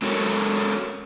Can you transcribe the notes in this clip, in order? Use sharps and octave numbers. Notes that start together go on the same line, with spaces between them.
G#3 C#4 F#4 A4 A#4 C#5